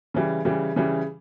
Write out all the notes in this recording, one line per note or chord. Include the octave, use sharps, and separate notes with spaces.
C#3 E3 G3
C#3 E3 G3
C#3 E3 G3